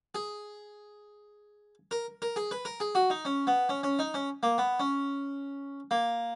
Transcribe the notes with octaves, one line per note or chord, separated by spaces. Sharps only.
G#4
A#4
A#4
G#4
B4
A#4
G#4
F#4
D#4
C#4
B3
C#4
C#4
D#4
C#4
A#3
B3
C#4
A#3